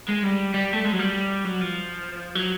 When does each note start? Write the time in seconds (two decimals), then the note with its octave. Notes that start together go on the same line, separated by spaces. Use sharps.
0.09 G#3
0.24 G3
0.54 G3
0.73 A3
0.85 G#3
0.93 F#3
0.99 G3
1.45 F#3
1.61 F3
2.35 F#3